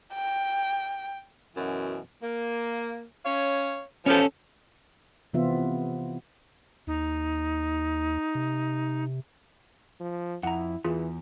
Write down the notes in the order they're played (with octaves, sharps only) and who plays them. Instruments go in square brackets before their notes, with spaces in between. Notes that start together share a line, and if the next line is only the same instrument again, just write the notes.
[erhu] G5
[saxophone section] F#2 B2 E3
A#3
C#4 C#5 F5
[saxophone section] B2 F3 [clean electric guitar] C#4 A4
[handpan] C3 E3 B3 C4 F4 E5
[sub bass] D#2 [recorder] D#4
[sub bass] C3
[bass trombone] F3
[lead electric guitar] F2 [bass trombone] E4 [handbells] F#5 A#5
[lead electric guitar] E2 [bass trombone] E3 [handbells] F4 G#4